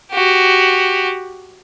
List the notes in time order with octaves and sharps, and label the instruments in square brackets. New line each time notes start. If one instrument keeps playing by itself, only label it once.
[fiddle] F#4 G4